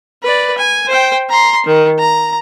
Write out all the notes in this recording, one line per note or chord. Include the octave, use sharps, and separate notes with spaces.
B4 D5
G#5
C5 G5
A#5 C6
D#3
A#5